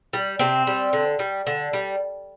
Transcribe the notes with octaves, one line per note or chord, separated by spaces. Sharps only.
G3
C3 C4
G3
D3
G3
D3
G3